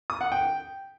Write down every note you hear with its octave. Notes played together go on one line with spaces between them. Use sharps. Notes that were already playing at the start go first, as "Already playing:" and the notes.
D#6
F#5
G5